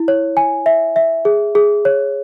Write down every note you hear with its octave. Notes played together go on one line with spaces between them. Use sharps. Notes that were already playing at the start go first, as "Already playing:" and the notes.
Already playing: E4
C#5
G#5
E5
E5
G#4
G#4
C#5